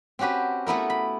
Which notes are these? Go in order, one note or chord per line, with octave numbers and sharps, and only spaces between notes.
C4 C#4 F#4 G4 B4
A3 B3 E4 A#4
B5